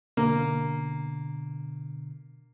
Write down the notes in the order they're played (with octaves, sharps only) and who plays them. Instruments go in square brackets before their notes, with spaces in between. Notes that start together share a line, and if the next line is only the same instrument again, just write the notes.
[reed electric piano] B2 D3 A#5 [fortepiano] A#3